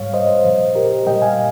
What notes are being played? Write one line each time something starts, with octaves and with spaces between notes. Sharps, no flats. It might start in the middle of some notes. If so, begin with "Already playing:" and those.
Already playing: G#2 G3 C#5 F5
C5 D#5
A#2 F3
G4 A#4
A#2 G3 D#5 G5
F5 G#5